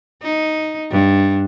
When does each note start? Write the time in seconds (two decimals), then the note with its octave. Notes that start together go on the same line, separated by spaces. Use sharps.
0.23 D#4
0.91 G2